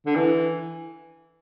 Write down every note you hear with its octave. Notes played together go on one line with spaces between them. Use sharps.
D3
E3